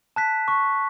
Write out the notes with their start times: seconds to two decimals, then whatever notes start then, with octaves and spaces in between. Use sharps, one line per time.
0.16 A5 F#6 B6
0.48 C#6